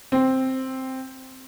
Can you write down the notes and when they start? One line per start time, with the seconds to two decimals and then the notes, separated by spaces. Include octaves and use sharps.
0.12 C4